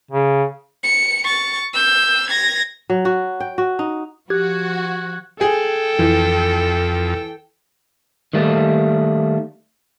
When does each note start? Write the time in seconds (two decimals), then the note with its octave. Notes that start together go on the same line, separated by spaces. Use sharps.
0.11 C#3
0.84 C#7
1.25 C#6 A6
1.74 E6 G6
2.29 G#6 A#6
2.90 F#3
3.05 F#4
3.40 G5
3.58 F#4
3.79 D#4
4.30 F3 F#4 G4 F#6 G#6
5.41 G#4 A4 G5
5.99 F2 E3
8.33 D#3 G3 A3 A#3